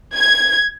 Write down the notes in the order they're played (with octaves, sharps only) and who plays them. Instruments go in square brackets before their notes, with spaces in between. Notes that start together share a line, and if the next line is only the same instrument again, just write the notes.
[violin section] G#6